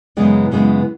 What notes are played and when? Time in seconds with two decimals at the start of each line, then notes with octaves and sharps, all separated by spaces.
0.17 F#2 C#3 E3 G#3 B3
0.52 F#2 C#3 E3 G#3 B3